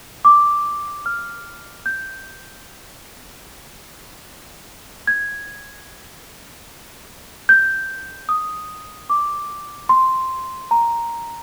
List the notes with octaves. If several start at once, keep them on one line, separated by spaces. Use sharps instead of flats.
D6
F6
G6
G#6
G6
D#6
D6
C6
A#5